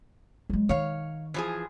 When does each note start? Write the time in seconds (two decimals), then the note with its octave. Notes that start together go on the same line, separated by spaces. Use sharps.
0.50 F#3 G#3
0.69 D#3 C#5 F5
1.34 E3 F3 G#4